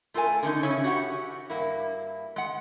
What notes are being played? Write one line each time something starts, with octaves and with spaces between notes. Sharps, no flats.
A3 F4 A4 A#4 G#5
D3 C#4 D#4
C#3 C#4 E4 C#5
F#4 G4 F5 F#5
G2 A#3 E4
G#3 F#5